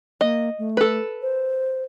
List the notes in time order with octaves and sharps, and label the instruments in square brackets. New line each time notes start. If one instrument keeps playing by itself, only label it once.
[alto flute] A#3 [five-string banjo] D#5
[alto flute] A3
[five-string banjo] A4 B4
[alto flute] C5